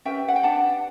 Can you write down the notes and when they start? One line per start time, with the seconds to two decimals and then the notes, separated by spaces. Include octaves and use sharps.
0.05 C#4 G4 B4 E5 G5
0.28 F#5
0.36 G5
0.43 D4 G4 B4 F#5 A5